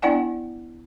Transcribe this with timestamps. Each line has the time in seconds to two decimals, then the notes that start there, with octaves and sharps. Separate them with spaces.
0.02 B3 D4 E4 D5 F#5 G#5